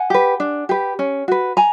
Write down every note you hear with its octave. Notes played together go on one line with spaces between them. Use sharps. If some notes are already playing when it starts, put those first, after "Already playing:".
Already playing: F#5 G#5
G4 B4
D4
G4 B4
C#4
F#4 B4
G#5 A#5